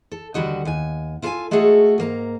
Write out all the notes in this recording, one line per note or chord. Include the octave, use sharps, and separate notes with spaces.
A4
D#2 D3 G3 F#4 D#5
D#2 G#5
E4 F4 A4 A#4 F5 G#5
G#3 A3 F4 F#4 G#4 A4
G#2 A#3 A#5